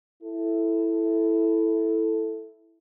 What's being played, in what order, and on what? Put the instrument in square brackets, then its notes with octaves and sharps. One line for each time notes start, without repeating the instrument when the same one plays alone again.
[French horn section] E4 A4